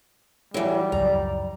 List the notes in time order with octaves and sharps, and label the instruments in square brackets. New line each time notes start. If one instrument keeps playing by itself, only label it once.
[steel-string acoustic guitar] E3 F#3 [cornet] G3
[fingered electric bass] C#2 F#2 F3 [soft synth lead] D5 [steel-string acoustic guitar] A#5